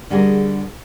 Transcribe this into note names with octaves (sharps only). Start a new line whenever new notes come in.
D3 G3 F#4 G#4 A#4